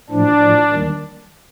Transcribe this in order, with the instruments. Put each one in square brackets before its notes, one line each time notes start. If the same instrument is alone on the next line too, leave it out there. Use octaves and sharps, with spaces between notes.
[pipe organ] A2 F3 D4
A2 F3
D#2 D#3 G3